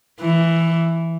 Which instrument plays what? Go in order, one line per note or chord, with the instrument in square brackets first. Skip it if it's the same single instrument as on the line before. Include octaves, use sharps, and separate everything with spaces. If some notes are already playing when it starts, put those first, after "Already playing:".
[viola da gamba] E3